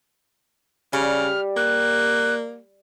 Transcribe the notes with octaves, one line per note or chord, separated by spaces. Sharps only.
C#3 G3 F6
A#3 F#6